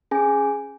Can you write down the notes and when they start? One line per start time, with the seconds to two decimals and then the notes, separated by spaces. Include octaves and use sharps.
0.11 C#4 G#4 G#5